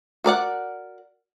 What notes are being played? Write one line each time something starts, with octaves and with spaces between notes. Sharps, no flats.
F#4 A#4 D5 F#5